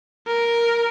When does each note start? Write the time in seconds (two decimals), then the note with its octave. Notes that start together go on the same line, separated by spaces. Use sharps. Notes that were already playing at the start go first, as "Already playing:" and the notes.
0.27 A#4